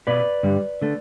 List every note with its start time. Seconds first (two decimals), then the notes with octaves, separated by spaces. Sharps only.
0.07 B2 B3 B4 D5
0.43 G2 D3 G3
0.82 D3 A3